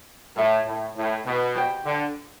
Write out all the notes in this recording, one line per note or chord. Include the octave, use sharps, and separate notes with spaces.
A2 A4 E5 A5
A2
A2
B2
G4 C5 G5
D3